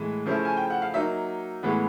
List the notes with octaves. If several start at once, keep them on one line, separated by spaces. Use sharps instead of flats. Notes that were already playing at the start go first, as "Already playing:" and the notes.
Already playing: A2 E3 G#3
C#3 F3 A3 C#4 E4
G#5
G5
F#5
F5
F#3 A#3 D#4 E5
A2 E3 G#3 B3